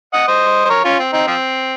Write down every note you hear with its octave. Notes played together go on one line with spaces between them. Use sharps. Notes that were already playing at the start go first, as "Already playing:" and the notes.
D#5 F#5
C5 D#5
C5
A#4 C#5
C#4 F4
C4
C4 D#4
F3 C4